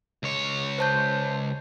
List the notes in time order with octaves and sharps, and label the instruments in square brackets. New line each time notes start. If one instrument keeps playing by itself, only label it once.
[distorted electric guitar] C#2 C#5
[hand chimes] C5 A5 G6